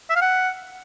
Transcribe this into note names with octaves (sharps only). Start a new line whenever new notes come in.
E5
F5
F#5